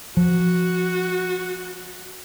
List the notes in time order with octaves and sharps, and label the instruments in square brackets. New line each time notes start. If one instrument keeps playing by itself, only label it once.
[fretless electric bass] F3 [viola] F#4